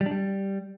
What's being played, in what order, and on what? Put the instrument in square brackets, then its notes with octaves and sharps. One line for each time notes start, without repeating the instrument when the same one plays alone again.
[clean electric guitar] G3
D4
G3